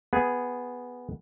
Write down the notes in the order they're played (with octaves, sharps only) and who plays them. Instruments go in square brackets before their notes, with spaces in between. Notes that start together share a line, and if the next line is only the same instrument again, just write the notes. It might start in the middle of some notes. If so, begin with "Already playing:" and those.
[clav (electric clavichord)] B3 G#4